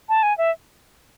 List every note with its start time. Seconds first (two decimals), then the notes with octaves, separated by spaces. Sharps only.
0.09 A5
0.23 G#5
0.38 E5